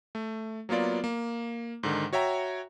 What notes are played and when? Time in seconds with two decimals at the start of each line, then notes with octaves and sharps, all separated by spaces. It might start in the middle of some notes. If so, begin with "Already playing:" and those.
0.15 A3
0.69 F#3 A#3 B3 F4 D5
1.04 A#3
1.83 G#2 D3 D#3
2.13 F#4 C#5 E5 G5 A#5